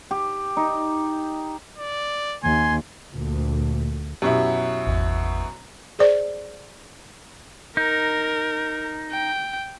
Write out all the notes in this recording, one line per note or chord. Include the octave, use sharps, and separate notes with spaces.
G4
D#4
D5
D#2 G#5 C6
D2 A#2
F#2 B2 E4 G4
G#1 E2
G#4 C5 D5
D#4 A#4
G5